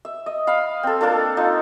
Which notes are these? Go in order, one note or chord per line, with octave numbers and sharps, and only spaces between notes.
E5
D#5
F5 B5
C4 A4
A#3 D4 F4 A4
D#4 F4